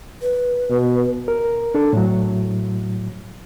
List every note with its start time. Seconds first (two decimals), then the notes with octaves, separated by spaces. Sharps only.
0.22 B4
0.70 B2
1.28 A#4
1.75 D4 A4
1.93 A2 F#3